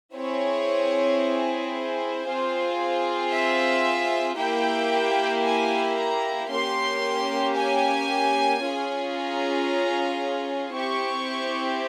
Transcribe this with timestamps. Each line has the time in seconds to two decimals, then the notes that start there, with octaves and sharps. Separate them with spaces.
0.14 C4 E4 G#4 C#5
1.74 C5
2.27 C4 F4 G#4
3.31 E5
4.37 A#3 E4 G4 G5
5.44 G#5
5.97 A#5
6.49 A#3 C#4 G4 C6
7.55 G#5
8.61 C#4 F4 G#4
9.14 A#5
10.72 C4 E4 G4 C#6